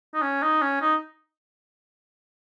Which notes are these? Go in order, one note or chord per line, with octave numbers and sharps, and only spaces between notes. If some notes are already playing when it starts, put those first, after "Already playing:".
D#4
C#4
D#4
C#4
D#4